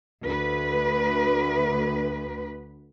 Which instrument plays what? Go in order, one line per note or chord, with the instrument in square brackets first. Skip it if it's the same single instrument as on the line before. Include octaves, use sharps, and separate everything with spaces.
[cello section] D2 B4